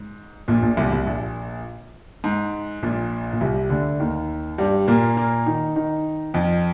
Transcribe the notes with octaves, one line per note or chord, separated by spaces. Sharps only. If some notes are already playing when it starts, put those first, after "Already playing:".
Already playing: G#2
A#1 A#2
A#1 A#2
C2 C3
C2 C3
A#1 A#2
G#2
A#1 A#2
A#2
C2 C3
D2 D3
D#2 D#3
G2 G3
A#2 A#3
A#2 A#3
D#3 D#4
D#3 D#4
F2 F3